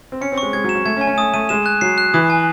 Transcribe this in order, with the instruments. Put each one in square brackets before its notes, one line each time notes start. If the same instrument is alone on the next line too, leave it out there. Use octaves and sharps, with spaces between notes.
[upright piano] C4
[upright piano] C#4 [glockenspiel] C#7
[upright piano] C4
[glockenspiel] C#6
[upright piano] G#3
[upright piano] G#3 [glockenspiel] G#6
[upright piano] F#3
[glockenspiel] E7
[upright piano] F#3
[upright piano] A3 [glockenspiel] G#6
[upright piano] C#4
[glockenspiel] G#5
[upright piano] C#4
[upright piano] A3 [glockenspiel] D#6
[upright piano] A3 [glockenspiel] D#7
[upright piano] G#3 [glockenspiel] E7
[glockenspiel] F#6
[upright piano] F#3 [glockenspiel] C7
[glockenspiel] F#6
[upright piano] E3 [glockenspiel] D#6
[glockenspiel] G#5